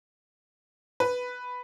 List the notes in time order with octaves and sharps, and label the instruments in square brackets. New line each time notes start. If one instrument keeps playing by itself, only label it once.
[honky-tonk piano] B4